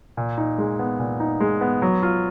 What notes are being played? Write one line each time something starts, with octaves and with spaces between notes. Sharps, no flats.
A#2
D#4
G#3
B3
A#2
D#4
G#3
B3
F#3
F4